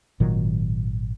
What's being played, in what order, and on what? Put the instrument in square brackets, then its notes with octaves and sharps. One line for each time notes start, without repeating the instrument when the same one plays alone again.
[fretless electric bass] G#1 A#2 D#3 F#3